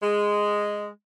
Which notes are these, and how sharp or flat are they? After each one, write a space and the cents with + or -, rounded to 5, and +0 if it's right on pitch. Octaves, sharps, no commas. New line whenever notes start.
G#3 -5